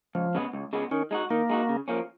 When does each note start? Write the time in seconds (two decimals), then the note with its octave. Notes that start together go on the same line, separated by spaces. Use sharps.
0.15 C#2 F3
0.35 C#3 G#3 B3
0.53 C#2
0.73 C#3 G#3 B3
0.91 D#3 C#4
1.11 G#3 D#4 F#4
1.30 D#3 A#3
1.50 G#3 D#4 F#4
1.69 C#3
1.88 F3 A#3 C#4